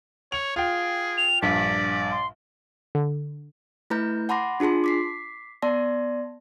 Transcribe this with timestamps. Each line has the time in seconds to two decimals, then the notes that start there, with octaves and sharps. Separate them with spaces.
0.32 C#5 F7
0.56 F4 G#4 G5
1.17 F7
1.42 A#1 G2 D5 B6
2.11 C6
2.95 D3
3.90 A3 E4 B4 A#5 G6
4.29 F#5 A5 B5 C6 D6 A#6
4.60 D4 F4 G#4 A5 C6
4.84 D6 B6 C7
5.62 B3 D5 A5 C6 A#6